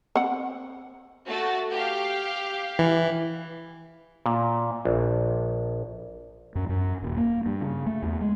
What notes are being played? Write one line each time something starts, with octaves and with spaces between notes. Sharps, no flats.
C4 F#5
A3 F#4 A6
G4 F5
E3
A#2
A#1
F#2
F#2
D#1
A#3
G2
C#3
A3
E2
G#3